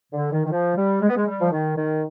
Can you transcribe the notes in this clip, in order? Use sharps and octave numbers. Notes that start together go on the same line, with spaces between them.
D3
D#3
D#3
F3
G3
G#3
B3
G#3
G3
F3
D#3
D#3